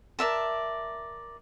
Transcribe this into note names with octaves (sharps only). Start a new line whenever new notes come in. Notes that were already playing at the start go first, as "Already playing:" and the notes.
A#4 D5 E5 A5